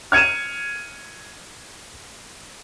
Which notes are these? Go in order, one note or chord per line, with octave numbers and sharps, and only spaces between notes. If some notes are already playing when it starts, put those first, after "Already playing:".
F6 G#6 C#7 D#7 E7